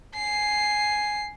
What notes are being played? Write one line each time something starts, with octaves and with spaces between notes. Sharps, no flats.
G#5 C7